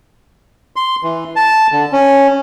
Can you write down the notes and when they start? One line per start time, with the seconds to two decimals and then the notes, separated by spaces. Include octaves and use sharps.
0.76 C6
1.03 E3
1.36 A5
1.72 D3
1.93 C#4